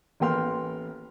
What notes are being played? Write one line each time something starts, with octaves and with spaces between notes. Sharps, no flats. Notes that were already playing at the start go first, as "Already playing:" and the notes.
A1 A#3 B3 G5 C6 F6